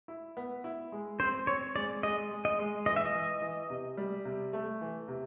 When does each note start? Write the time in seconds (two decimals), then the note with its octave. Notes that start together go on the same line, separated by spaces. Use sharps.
0.08 E4
0.37 B3
0.64 E4
0.92 G#3
1.20 C4 C5
1.47 C4 C#5
1.76 G#3 D5
2.03 G#3 D#5
2.31 G#3
2.45 D#5
2.59 G#3
2.86 E3 D#5
2.96 E5
3.05 D#5
3.15 E3
3.42 E3
3.70 C3
3.97 G3
4.25 C3
4.53 A3
4.81 E3
5.08 C3